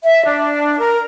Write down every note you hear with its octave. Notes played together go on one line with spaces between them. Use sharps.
E5
D4
A#4